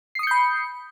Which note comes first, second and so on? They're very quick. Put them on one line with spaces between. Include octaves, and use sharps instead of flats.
C7 D#6 C#7 G6 B5